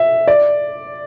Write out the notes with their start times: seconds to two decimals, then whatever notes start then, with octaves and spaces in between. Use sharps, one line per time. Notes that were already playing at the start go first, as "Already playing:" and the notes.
Already playing: E5
0.28 D5